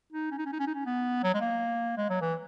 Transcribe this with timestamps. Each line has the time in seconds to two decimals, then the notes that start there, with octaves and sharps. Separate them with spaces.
0.13 D#4
0.31 C#4
0.38 D#4
0.46 C#4
0.52 D#4
0.59 C#4
0.67 D#4
0.75 C#4
0.86 B3
1.23 F#3
1.34 G#3
1.41 A#3
1.97 G#3
2.10 F#3
2.21 E3